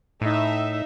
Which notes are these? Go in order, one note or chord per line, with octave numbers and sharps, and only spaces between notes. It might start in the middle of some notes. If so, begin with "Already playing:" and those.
A2 D#4 E5